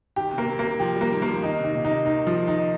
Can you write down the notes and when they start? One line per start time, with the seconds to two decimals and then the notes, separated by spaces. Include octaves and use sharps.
0.16 D#3 G4
0.33 C3
0.38 A#3
0.48 C3
0.59 C3 A#3
0.80 F3 G4
0.96 G3 A#3
1.12 D#3
1.22 A#3
1.27 F3
1.43 D#3 D#4
1.59 C3
1.64 D#4
1.74 A#2
1.85 D#4
1.91 C3
2.06 D#3 D#4
2.27 F3
2.48 D#4